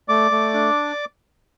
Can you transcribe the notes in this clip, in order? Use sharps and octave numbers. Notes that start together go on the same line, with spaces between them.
A3 D5 D6
A3
D4